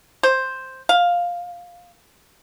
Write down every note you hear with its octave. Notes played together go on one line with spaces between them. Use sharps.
C5
F5